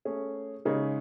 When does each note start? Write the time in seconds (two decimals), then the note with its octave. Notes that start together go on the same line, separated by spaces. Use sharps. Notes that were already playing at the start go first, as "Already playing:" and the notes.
0.05 A3 C#4 G#4
0.65 C#3 G#3 D#4 G#4 C#5